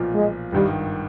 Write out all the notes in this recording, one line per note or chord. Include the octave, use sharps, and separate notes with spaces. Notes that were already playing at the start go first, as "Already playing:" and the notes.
Already playing: B1 A#2 F3
G#3
G#1 G2 D#3 G3